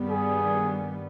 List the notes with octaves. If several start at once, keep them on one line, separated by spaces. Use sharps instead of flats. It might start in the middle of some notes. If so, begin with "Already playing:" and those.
Already playing: G2 D#3 G3 B3
G#4